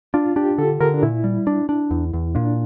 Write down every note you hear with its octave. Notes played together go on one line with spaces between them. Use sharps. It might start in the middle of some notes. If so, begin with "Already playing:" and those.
D4 F4
D4 G4
D3 A4
D3 A#4
D4
A#2 E4
G3
D4
D4
E2
E2
A#2 D4